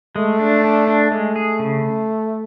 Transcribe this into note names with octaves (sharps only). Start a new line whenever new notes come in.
G#3 A3
D4
D4
D4
G#3 A3
G#4
C#3